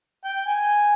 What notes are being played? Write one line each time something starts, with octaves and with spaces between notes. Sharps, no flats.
G5
G#5